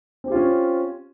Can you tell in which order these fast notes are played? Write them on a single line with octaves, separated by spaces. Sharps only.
C4 G4 F4 C#4